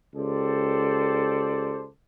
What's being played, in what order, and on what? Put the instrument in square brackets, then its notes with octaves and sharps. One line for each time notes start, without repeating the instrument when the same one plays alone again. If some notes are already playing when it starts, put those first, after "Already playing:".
[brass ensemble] C#2 G4 A4 C5 D5